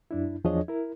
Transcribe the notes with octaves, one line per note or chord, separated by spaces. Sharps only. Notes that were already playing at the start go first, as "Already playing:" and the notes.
F#2 D4 E4
E2 F3 D4 G#4 C#5 D#5
E4 A#4